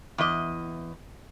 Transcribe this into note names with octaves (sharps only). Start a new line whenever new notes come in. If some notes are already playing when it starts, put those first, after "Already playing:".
E2 D#5